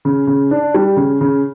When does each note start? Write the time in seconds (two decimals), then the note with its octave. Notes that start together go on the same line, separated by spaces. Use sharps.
0.05 C#3
0.27 C#3
0.51 D4
0.74 G3
0.97 C#3
1.21 C#3